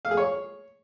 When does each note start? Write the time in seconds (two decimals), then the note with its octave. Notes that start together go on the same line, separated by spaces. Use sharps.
0.05 F5
0.11 G#4
0.17 C#5